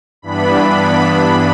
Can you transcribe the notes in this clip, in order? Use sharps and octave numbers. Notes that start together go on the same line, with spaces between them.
G2 E3 B3 D4 B5